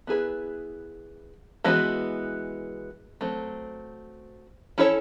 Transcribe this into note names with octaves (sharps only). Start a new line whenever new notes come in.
B3 E4 G#4 B4
E3 G#3 B3 D#4 F#4
F#3 A3 C4
C#4 E4 A4 C#5